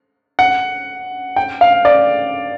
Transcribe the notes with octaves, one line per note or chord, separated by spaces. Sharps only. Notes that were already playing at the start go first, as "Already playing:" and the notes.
F#5
G5
F5
D5